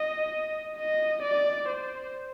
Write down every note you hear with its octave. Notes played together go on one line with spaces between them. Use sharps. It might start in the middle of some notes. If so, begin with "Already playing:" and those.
Already playing: D#5
D#5
D5
C5